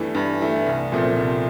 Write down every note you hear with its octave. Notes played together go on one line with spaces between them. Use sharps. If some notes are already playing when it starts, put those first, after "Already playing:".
Already playing: G2 E3 A3
G2
E3 A3
C2
A#2 F3 A3 C4
C2